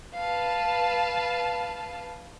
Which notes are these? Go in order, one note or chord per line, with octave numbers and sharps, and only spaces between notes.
B4 F5 A5